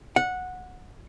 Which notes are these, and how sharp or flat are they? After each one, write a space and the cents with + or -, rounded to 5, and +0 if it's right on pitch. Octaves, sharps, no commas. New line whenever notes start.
F#5 -15